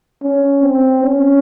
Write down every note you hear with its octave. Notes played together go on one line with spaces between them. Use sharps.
C#4
C4
C#4